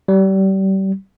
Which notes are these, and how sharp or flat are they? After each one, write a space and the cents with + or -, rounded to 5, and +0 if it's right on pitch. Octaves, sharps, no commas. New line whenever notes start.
G3 -30